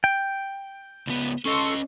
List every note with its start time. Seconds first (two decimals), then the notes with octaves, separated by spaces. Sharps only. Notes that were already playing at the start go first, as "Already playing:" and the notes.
0.04 G5
1.07 C#2 B3
1.45 C#4 A4 D#5 C6 C#6